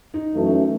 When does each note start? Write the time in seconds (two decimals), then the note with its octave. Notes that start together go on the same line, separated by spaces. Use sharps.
0.14 D#4
0.34 F#2 E3 A3